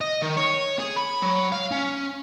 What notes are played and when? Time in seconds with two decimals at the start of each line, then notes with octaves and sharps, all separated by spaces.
0.01 D#5
0.22 D#3
0.37 C#5
0.79 G#4
0.96 B5
1.22 F#3
1.52 F5
1.72 C#4